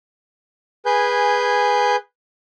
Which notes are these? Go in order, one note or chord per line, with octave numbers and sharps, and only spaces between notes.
G#4 B4 G#5 G6